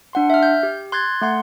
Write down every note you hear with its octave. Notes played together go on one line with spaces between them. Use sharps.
D4 F#5 C6
E5 F6
G6
G4
C6 F#6 G#6 A6
A3 F#5 C6